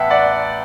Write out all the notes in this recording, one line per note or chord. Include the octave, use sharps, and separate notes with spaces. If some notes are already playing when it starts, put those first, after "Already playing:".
Already playing: A1 B3 E5 F#5 G5 A5
D5 F#5